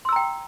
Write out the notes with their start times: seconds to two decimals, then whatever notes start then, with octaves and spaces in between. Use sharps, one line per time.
0.05 C6
0.09 E6
0.12 A#5
0.16 G5